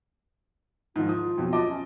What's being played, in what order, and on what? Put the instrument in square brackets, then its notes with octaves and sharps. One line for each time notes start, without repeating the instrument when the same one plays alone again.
[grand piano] G#2 D#3 F3 [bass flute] F4
[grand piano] D#6
F2 B2 F#3
D#5 A5 D6
[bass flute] C#4